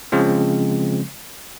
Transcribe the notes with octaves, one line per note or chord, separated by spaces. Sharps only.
C#3 F3 G#3 C4